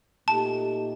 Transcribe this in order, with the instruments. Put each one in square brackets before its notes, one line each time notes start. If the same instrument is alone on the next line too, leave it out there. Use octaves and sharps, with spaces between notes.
[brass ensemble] A#2 A3 D#4 G4 [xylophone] A5